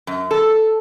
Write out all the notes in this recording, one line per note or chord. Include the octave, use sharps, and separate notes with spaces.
F#2
A4